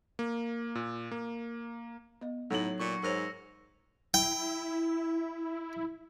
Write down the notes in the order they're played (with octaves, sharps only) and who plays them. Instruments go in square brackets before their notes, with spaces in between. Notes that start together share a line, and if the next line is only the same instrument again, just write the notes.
[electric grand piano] A#3
A#2
A#3
[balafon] B3 D#5
[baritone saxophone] A2 [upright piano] F#3 F#7 [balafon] D#4 A4
[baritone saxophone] A#2 [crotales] C#6 C#7
[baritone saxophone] G#2 [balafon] A#4 C5 C#5 [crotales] E6 A#6 F7
[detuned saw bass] E4 [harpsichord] G5